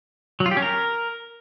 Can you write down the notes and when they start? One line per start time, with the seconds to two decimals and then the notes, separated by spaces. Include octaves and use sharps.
0.40 F#3
0.46 F4
0.51 G4
0.57 C#4
0.62 A#4